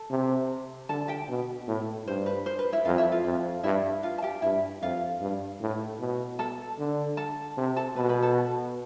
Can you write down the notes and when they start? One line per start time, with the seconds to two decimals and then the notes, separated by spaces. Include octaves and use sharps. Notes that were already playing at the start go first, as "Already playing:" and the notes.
Already playing: A4
0.10 C3
0.89 D3 A4 A5
1.08 G4 G5
1.29 B2
1.67 A2
2.07 G2 C5
2.26 B4
2.46 C5
2.59 B4
2.72 E4 E5
2.85 F2 F4 F5
2.98 E4 E5
3.12 F4 F5
3.25 F2
3.64 G2 E4 E5
4.03 F4 F5
4.18 A5
4.22 G4 G5
4.42 G2 E4 E5
4.82 F2 F4 F5
5.22 G2
5.61 A2
6.00 B2
6.39 A4 A5
6.79 D3
7.17 A4 A5
7.58 C3
7.77 A4 A5
7.96 B2 B4 B5
8.09 B4 B5
8.22 A4 A5